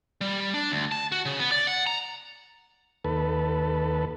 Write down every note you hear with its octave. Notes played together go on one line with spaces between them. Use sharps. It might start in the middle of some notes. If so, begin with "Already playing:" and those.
G3
D4
D2
A5
F#4
C#3
B3
D5
F#5
A#5
D#2 A4 B4